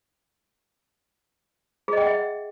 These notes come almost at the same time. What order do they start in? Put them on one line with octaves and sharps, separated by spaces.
G#4 D#5 G5 F#5 E5